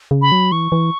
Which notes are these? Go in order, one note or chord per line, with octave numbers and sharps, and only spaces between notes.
C#3
B5
F#3
E3 C#6
E3